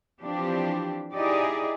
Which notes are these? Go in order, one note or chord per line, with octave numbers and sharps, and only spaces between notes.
E3 F3 C4 D4 G4
D#4 E4 G4 G#4 D5 D#5